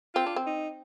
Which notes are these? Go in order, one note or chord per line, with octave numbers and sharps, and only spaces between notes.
C4 F4
D4
C4
D#4